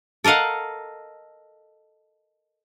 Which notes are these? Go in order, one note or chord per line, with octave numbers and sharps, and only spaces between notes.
A4 A#4 D#5 F5 F#5